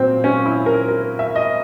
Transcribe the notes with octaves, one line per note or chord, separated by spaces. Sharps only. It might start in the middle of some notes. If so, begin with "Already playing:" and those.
Already playing: A#2 F#3 C4
C#4
E4
A#4
A#4
E5
D#5